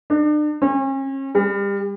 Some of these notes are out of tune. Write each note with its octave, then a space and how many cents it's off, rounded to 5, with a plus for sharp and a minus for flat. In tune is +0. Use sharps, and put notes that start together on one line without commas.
D4 +40
C#4 -40
G3 +30